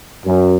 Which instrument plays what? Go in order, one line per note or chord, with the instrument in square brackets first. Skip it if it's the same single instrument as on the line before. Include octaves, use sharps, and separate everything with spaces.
[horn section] F#2